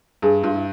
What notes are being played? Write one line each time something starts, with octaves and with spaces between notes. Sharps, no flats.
G2 G#4
G2 F4
E4